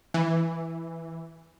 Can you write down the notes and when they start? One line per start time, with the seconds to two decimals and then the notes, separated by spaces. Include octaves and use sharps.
0.14 E3